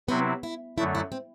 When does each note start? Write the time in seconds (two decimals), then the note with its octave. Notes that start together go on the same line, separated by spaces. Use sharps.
0.08 C3 F#3 B3 C4 E4
0.43 E4
0.78 F#2 D3 F#3 A3 E4
0.95 E4
1.12 C4